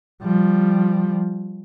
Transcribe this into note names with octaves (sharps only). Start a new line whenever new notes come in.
F3 G3